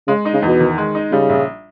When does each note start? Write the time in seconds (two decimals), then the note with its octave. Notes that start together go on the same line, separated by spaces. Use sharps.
0.08 C#3 G#3
0.25 D#4
0.34 C#3
0.42 E2 B2
0.60 D#3
0.78 G#3
0.95 D#4
1.12 C#3 G3
1.29 A#1